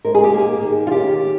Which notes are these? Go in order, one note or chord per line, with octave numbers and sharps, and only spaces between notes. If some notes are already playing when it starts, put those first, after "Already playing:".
G#2 A#4
G#4
G4
A#3 G#4
D#3
F4
C#4 G4